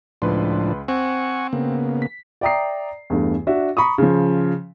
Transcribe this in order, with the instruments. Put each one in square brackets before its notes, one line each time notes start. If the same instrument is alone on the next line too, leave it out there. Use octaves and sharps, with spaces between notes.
[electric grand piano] C#2 B4 C6 [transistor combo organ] A2 F3 D4
[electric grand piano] C4 [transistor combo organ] F#5 G#5 C#6
[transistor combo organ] C#3 A#3 B3
[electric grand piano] B6
[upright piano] D5 E5 G5 A#5 D#6 C7
E2 G2 A3
D4 F#4 E5
A#5 B5 C#6 D#6
C#3 F3